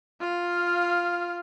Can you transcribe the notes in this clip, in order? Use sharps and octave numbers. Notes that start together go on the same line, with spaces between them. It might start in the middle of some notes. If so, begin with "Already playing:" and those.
F4 F5